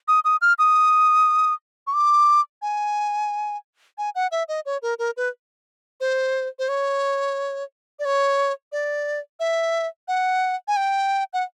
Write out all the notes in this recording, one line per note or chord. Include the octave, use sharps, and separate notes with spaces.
D#6
D#6
F6
D#6
C#6
D6
G#5
G#5
F#5
E5
D#5
C#5
A#4
A#4
B4
C5
C5
C#5
D5
C#5
D5
E5
F#5
G#5
G5
F#5